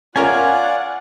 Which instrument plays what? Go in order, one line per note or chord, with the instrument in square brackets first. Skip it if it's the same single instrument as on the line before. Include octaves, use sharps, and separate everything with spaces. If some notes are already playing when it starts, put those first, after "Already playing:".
[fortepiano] C#4 A#4 E5 [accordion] F4 D5 [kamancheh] F#5 [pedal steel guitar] G#5